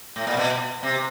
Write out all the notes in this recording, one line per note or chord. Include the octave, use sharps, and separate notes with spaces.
A2
A#2
B2
C3